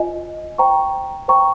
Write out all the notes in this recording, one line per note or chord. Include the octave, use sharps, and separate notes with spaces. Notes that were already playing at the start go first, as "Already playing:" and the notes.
Already playing: F4 C5 D#5 G#5
C5 G5 A#5 C#6
C5 G5 A#5 C#6